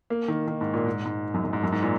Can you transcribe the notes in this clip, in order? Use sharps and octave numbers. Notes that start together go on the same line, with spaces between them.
A#3
D#3
D#3
G#2
A#2
G#2
G#2
F#2
F#2
G#2
F#2
G#2
A#2